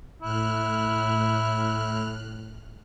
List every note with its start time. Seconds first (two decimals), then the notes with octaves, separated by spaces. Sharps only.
0.22 A2 E4 F6 F#6